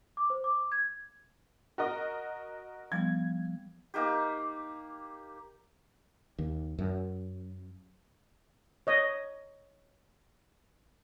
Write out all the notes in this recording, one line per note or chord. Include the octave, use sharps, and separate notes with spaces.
D6
C5
D6
G#6
F#4 A#4 D#5
F3 G3 B3 G#6
A#3 D#4 G4
D#2
F#2
C#5 D#5